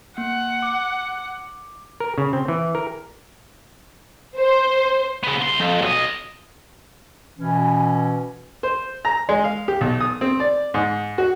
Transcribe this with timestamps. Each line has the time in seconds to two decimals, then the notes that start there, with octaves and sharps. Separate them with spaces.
0.18 A#3 F#5
0.63 D6
2.00 A#4
2.18 C#3
2.33 C4
2.48 E3
2.75 A#4
4.39 C5
5.23 C#3 B3
5.42 C2 C6
5.60 F2
5.82 B1 D#5
7.38 B2 E3 C#4
8.63 C5
9.05 A#5
9.29 G#3
9.44 F5
9.68 G4
9.81 B1
10.00 D#6
10.21 C4
10.40 D5
10.74 G#2
11.18 F#4